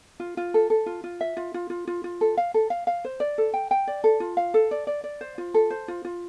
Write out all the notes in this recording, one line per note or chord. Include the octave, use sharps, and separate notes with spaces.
F4
F4
A4
A4
F4
F4
E5
F4
F4
F4
F4
F4
A4
F5
A4
F5
F5
C5
D5
A4
G5
G5
D5
A4
F4
F5
A4
D5
D5
D5
C5
F4
A4
C5
F4
F4